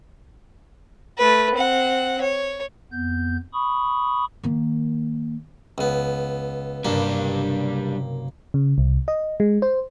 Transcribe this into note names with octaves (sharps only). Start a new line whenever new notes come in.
A3 B4
C4 F#5
C#5
F2 B3 G6
B5 C#6 D#6
D#3 A#3
C#2 B3
F#1 G2 C3 G3 A#3 D4
C#3
C2
D#5
G#3
C5